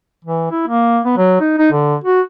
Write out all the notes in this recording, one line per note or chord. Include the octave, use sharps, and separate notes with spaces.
E3
E4
A#3
B3
F#3
D#4
D#4
D3
F#4